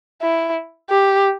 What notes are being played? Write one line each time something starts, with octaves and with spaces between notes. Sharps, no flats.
E4
G4